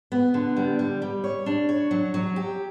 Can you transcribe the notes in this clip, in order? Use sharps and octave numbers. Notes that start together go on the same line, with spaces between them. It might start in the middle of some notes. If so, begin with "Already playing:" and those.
B3
D3
G3
G3
G3
C#5
D4
C#5
F#3
F#3
G4